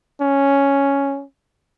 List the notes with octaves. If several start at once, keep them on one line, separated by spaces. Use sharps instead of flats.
C#4